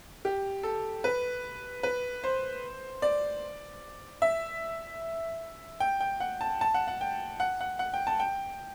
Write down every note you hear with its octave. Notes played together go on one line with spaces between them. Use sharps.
G4
A4
B4
B4
C5
D5
E5
G5
G5
F#5
A5
A5
F#5
F#5
G5
F#5
F#5
F#5
G5
A5
G5